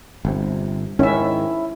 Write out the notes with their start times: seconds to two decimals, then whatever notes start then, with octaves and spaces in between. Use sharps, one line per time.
0.25 G1 C3
0.99 G#2 D#3 C#4 E4 E5